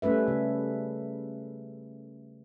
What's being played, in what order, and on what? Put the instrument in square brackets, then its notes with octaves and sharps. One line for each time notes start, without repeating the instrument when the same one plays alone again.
[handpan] G3 A3 C#4 B4 E5
C#3